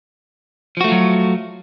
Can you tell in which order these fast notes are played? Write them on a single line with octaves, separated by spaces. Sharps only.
F3 F#4 A3 F4 F#3